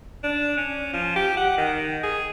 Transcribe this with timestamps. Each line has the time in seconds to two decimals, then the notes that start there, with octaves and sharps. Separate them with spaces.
0.23 D4
0.57 C#4
0.93 F3
1.16 G4
1.37 F#5
1.58 D#3
2.03 G#4